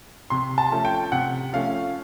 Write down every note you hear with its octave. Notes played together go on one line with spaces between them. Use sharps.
C3 C6
A5
F3 A3 C#4
G5
C3 F#5
F3 A3 C#4 F5